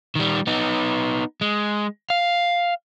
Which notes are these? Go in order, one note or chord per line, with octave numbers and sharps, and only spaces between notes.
D#3 G3
B3 D#4
G#3
F5